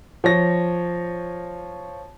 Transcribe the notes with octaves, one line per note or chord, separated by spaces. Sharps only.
F3 C#5 A#6